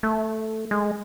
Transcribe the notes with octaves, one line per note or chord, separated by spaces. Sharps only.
A3
G#3